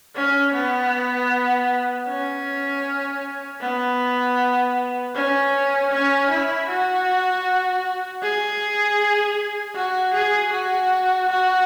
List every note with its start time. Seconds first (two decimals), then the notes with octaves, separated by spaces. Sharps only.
0.15 C#4
0.54 B3
2.08 C#4
3.61 B3
5.15 C#4
5.91 C#4
6.30 E4
6.69 F#4
8.22 G#4
9.75 F#4
10.14 G#4
10.53 F#4
11.29 F#4